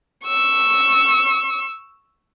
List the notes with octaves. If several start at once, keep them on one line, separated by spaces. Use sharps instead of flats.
C#6 E6